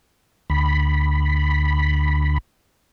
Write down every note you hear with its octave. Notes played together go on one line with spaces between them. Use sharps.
D2 B5